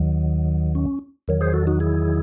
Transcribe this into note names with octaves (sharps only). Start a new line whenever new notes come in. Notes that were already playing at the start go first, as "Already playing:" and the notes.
Already playing: D#2 D#3 F#3
C#4
E2 D#3 F#3
G#4 C5
F#4 A4
D#4 F#4
E4 G#4